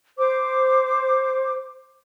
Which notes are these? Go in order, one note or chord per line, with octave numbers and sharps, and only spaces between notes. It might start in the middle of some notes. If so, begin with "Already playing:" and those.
C5 D6